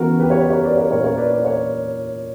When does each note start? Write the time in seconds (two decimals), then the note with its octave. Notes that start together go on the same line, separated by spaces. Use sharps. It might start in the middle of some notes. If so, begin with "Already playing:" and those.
Already playing: C#3 E3 B3 F#4 A#4
0.19 G4 B4
0.30 C#5
0.37 G4 B4
0.50 A#4 C#5
0.63 B4 D5
0.77 A#4 C#5
0.91 A#2 A#3 C#4 A#4 C#5
1.04 A#4 C#5
1.17 B4 D5
1.31 B4 D5
1.44 A#4 C#5